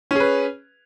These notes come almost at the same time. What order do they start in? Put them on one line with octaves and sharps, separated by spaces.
C#4 G#4 B4